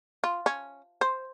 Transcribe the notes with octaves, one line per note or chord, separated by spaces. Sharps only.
F4
C#4
C5